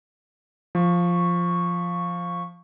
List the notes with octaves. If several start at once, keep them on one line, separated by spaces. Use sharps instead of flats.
F3 C#6